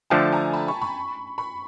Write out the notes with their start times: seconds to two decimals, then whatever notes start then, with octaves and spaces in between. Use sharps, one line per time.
0.10 D3 F3 A3 G5 A5
0.32 G#5 A#5
0.53 A5 B5
0.68 B5 C#6
0.81 B5 C#6
1.38 B5 C#6